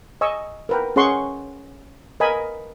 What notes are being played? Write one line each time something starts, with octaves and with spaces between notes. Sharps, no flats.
D#5 G#5 C#6 E6
A#4 B4 G5
C#4 G#4 C#5 F#5 C6 C#6
A#4 B4 D#5 G#5 B5